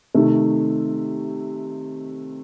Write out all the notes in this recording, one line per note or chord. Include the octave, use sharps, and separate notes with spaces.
C3 D#3 A3